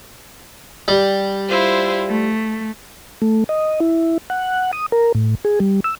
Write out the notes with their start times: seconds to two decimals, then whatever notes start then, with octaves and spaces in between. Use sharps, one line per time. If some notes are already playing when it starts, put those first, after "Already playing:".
0.88 G3
1.47 E4 F4 C5
2.07 A3
3.22 A3
3.49 D#5
3.80 E4
4.30 F#5
4.73 D#6
4.92 A#4
5.15 A2
5.45 G#4
5.60 G3
5.84 E6